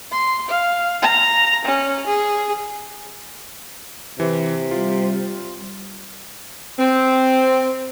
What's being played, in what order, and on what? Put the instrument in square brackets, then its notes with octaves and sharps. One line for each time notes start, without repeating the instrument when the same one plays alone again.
[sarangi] C6
F5
A#5
C#4
G#4
[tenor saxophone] C3 [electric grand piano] E3
[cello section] G3 [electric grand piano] F4
[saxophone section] C4